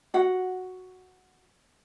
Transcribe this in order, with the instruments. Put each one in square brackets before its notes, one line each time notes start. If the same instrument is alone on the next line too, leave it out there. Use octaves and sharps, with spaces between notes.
[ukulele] F#4 F#5